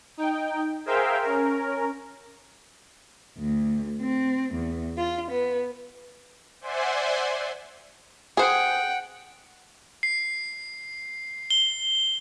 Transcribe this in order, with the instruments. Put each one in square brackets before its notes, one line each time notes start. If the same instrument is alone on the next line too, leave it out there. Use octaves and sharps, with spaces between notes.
[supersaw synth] D#4 G5
G#4 A#4 C5 E5 F5 G5
C#4 A#4
[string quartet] D2
C4
E2
F4
B3
[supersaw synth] C5 D5 E5 F#5 G#5 C6
[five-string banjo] G#4 C5 [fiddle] F#5 G5
[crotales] C7
G7